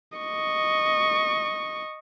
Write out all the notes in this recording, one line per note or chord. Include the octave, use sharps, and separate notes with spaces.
D#5 C#6